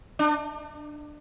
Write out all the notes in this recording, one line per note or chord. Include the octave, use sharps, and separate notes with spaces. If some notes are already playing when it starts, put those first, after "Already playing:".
D4